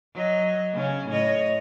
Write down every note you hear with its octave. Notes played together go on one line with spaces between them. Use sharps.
F#3 D#5
C#3 C#4
A2 C#5 D#5